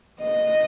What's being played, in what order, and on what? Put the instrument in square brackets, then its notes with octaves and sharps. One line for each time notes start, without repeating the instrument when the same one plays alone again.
[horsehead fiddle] D#5